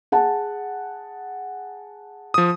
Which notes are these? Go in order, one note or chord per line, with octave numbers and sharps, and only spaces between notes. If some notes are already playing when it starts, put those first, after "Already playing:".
G#4 F#5 A5
F3 D#6